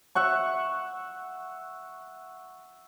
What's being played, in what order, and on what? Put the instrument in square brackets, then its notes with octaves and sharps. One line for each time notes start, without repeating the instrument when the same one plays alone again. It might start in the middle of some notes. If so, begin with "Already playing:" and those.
[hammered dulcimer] E5 F#5 C#6